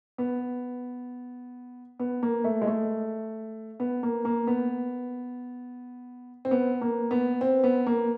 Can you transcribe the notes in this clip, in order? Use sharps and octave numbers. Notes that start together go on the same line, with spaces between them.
B3
B3
A#3
A3
G#3
A3
B3
A#3
A#3
B3
C4
B3
A#3
B3
C4
B3
A#3